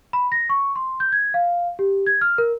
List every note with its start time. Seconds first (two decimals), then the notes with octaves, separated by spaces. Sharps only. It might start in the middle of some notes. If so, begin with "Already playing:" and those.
0.13 B5
0.32 A#6
0.49 C#6
0.76 C6
1.00 G6
1.12 G#6
1.34 F5
1.79 G4
2.07 G#6
2.21 F6
2.38 A#4